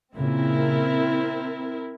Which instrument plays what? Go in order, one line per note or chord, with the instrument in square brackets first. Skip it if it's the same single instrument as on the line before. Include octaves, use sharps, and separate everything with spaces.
[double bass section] A#2 C#3 [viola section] C4 E4 A#4